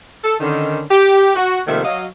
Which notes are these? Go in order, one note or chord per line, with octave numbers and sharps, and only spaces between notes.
A4
D3 D#3 C#4
G4
F#4
C3 D#3 F3 A3 A#3 E5
F#3 D#5 F5